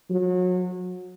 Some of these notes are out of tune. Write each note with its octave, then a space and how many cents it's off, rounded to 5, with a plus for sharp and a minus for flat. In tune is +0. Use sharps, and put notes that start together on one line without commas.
F#3 -30